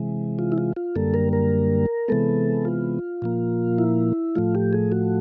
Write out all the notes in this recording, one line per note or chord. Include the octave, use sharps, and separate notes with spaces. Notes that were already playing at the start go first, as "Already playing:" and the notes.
Already playing: C3 E3 G#3
F4
E4
F4
F4
F#2 D3 G3 A#3 A4
A#4
A#4
C3 E3 G#3 B3 A4
F4
A#2 F3 A#3
E4
A2 F3 A3 F4
G4
G#4
F#4